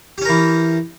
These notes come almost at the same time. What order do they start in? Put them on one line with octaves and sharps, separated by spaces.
G4 C#4 A#4 E3